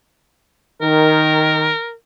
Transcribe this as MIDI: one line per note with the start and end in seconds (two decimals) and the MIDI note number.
0.81 1.70 51
0.81 1.93 70